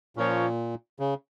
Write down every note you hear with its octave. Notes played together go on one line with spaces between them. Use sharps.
A#2 F3 A#3 C#4 A#4 C#5
C#3